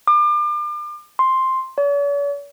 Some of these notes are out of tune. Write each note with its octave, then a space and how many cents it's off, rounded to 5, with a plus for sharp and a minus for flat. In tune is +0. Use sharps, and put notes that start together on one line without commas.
D6 +35
C6 +5
C#5 +45